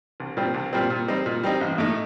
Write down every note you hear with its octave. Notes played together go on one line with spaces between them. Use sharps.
C2
A#2 G3 C4
C2
A#2 G3 C4
A#2
G3 C4 D#4
A#2
G3 C4 D#4
A1
A2 A3 D#4